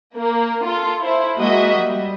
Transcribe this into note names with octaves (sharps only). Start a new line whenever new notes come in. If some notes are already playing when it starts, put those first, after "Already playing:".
A#3
F4 A4
E4 C5
G#3 A#3 F#4 D#5 E5
G3